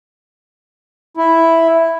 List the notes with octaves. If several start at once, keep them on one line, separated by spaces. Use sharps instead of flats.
E4